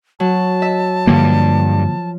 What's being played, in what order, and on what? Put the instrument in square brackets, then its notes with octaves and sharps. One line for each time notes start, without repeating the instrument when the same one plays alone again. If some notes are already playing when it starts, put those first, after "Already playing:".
[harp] F#3 [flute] A5
[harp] E5
[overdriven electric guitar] G2 [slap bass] D3 A#3 [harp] F3